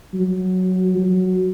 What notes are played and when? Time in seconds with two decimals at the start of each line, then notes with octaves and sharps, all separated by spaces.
0.14 F#3
0.97 F#3